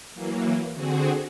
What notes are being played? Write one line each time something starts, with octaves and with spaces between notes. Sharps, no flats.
E3 F#3 A#3
D3 C4 F#4 G#4